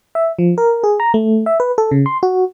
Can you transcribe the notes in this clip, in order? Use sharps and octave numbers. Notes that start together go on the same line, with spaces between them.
E5
F3
A#4
G#4
A#5
A3
E5
B4
A4
C#3
C6
F#4